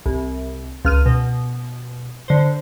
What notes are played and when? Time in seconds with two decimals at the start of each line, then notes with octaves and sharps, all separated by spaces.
0.06 C2
0.85 C#2 F6 D#7
1.06 B2
2.28 D3 C5